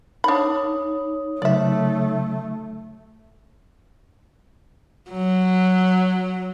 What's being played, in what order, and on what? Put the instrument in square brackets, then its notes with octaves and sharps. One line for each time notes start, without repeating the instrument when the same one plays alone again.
[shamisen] D4 B5 [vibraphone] D#4 C#5 D#6
[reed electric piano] C#3 F#3 [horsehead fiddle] A3 [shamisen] D5 E5
[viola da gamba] F#3